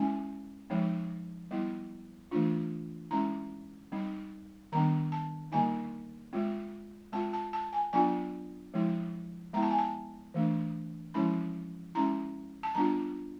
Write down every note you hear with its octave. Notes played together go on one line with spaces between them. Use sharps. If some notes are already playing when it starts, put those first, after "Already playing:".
Already playing: G#3 C#4 E4 G#5
F3 G#3 C4 D#4
G3 B3 E4
E3 A3 D4 F4
G#3 C#4 E4 A#5
G3 C4 D#4
D#3 G3 B3 D4 A#5
A5
D3 G3 A#3 D#4 G#5
G#3 C4 F4
G#3 C4 F4 A5
A5
A5
G#5
F#3 B3 D4 F4 G#5
F3 G#3 C4 E4
G#3 B3 E4 A#5
A5
G#5
A5
E3 A3 D4
F3 G#3 C#4 E4 B5
G#3 C#4 E4 A#5
A5
G3 B3 D4 F4 A#5